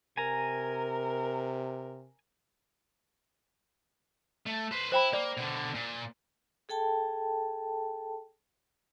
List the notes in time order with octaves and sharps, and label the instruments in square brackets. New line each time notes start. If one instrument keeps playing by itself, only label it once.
[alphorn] C3 [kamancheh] A#4 [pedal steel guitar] G#5 A#5
[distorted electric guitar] A3
B4 C5
[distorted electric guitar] E4 [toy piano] C5 G5 B5
[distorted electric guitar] A#3 [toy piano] D5
[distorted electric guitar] B2 D3
A#2
[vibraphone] G#4 A4 G5 A5